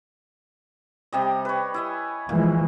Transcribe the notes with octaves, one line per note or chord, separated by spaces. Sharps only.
C3 G3 D#5
B4 C#5
E4 D#5 G#5
A#2 E3 F3 G#3